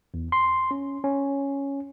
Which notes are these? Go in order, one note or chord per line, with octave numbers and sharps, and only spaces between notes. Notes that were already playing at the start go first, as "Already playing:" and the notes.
E2
C6
C#4
C#4